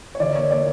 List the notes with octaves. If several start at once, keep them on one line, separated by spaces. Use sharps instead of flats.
C#5
D3 D5
A#3 C#5
A#3 D5